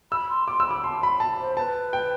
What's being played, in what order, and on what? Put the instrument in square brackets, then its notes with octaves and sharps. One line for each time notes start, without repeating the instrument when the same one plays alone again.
[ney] B5 [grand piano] E6
[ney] C6
[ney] C6 [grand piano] D6
[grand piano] E6
[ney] B5 [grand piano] D6
[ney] A5 [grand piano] C6
[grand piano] B5
A5
[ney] C5
[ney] B4 C5 [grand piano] A5
[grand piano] G5